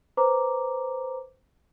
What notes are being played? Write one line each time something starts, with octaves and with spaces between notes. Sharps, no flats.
B4 C5 A#5 D6